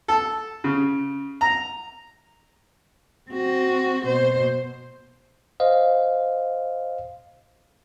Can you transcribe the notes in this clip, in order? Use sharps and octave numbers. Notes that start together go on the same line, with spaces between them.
A4
C#3
A#5
C4 F#4
B2 C5
C5 D#5 F5